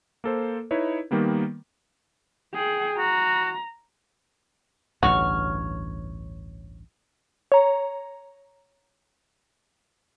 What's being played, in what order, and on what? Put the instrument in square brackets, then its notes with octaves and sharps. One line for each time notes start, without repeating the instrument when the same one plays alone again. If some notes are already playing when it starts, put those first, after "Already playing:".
[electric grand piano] A#3 A4 C5
D#4 E4 B4 C#5
D#3 G3 A#3 B3
[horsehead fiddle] G#4 G5
[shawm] F#4 [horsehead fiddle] A#5
[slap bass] A1 D2 G2 [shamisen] F#4 [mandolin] C#5 C#6 F6
[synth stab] C#5 A#5